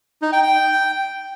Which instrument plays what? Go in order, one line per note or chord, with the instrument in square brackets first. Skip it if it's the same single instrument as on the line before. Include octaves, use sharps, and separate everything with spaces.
[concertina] D#4
G5
G5